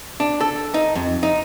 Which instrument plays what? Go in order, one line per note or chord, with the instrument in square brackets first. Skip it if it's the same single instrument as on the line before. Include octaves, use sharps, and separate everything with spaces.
[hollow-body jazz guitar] D4
A4
D#4
F2
D#4